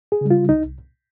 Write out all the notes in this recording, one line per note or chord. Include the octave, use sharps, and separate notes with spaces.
G#4
C#3 G3
F4
C2 D#4